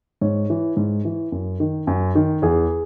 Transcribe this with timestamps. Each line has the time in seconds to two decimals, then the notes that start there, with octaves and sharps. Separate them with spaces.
0.21 G#2 C#5
0.50 E3
0.77 G#2
1.05 E3
1.32 F#2
1.60 D#3
1.87 F#2
2.15 D#3
2.42 E2 G#4